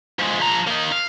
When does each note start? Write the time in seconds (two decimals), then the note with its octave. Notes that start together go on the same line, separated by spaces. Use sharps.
0.19 F3 G#3
0.40 F3 A#5
0.67 A#3 D#4
0.92 F5